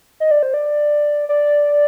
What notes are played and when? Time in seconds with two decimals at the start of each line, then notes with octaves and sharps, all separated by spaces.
0.20 D#5
0.31 D5
0.43 C5
0.54 D5
1.29 D5